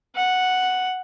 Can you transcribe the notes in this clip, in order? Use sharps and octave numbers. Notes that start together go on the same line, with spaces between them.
F#5